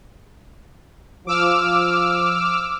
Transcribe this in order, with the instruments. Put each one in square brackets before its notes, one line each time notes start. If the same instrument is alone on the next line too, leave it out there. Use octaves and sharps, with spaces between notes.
[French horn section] F3 [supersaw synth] D6 E6 F6